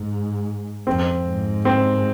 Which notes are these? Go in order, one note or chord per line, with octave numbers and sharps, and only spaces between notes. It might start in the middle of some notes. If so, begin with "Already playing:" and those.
Already playing: G#2
F2 C4
G#2
C4